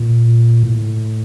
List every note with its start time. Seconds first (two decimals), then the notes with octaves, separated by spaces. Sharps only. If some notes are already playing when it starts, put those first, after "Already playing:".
Already playing: A#2
0.63 A2